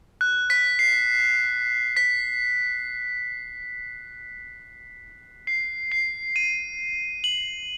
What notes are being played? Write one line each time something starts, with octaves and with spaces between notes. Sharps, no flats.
F#6
B6
C7
B6
C7
C7
D#7
F#7